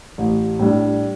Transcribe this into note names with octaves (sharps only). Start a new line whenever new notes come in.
A1
A2 G3 D4